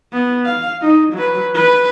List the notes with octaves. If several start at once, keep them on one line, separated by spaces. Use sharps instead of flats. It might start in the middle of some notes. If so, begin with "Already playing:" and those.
B3
F5
D#4
F#3 B4
B4